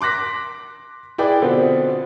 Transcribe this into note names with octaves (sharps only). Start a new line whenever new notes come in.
C6 D6 F#6 A#6 B6
E4 G#4 B4 D5 G5 D6
B2 D3 F3 B3 C4